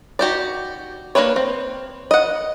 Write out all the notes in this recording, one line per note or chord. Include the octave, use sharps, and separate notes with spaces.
D#4 F#4 G4 D5
A#3 B3 D4 B4 C#5
C4
D#5 F#5